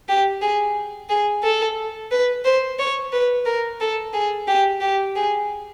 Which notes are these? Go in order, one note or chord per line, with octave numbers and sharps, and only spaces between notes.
G4
G#4
G#4
A4
B4
C5
C#5
B4
A#4
A4
G#4
G4
G4
G#4